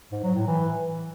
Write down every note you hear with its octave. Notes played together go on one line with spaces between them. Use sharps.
G#2
F#3
A2
E3